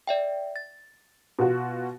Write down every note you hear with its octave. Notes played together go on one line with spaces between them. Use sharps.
D5 E5 G5
A6
B2 F4 F#4